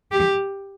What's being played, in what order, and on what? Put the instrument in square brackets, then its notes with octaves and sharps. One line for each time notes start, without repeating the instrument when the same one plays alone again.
[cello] G4